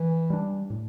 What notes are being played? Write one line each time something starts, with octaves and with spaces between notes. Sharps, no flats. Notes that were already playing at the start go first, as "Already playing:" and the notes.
Already playing: E3
G3 D4
A2